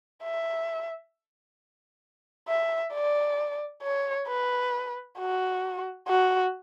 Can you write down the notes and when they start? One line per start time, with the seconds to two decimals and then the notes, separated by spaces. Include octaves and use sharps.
0.23 E5
2.48 E5
2.93 D5
3.83 C#5
4.28 B4
5.18 F#4
6.08 F#4